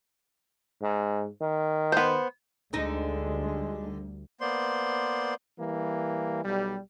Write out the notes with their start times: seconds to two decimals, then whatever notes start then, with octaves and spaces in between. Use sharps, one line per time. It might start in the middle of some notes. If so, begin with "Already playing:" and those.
0.82 G#2
1.41 D#3
1.92 B3 C5
2.73 D2 D3 G3 G#3 D#4
4.41 A#3 B3 C5 D5 C6
5.58 E3 G3 A#3
6.44 B1 G3